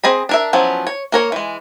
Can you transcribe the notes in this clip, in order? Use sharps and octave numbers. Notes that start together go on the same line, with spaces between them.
C4 G#4 D#5 B5
D4 A#4 E5
F3 F#3 B3 C#4 E4
C#5
A#3 A#4 C#5
E3 G#3